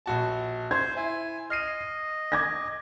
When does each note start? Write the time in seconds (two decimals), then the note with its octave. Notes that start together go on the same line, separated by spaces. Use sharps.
0.06 A#1 F#4 A5
0.71 C5 C6 G#6
0.97 E4 G#5
1.50 D#5 F6 C7 D#7
2.32 D6 G#6 A#6